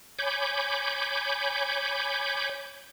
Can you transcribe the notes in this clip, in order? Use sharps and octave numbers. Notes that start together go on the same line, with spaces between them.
C#5 G#5 B5 D6 G6